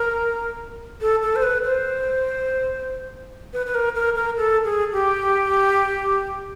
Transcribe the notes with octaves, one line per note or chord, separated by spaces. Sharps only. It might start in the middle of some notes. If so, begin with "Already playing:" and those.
Already playing: A#4
A4
A4
C5
B4
C5
B4
B4
A#4
A#4
A#4
A4
G#4
G4